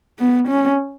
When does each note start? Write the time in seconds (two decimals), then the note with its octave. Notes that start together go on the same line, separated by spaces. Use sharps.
0.19 B3
0.48 C#4